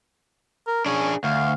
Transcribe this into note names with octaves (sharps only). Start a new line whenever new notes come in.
A#4
C#4 D4 G#4
D2 F5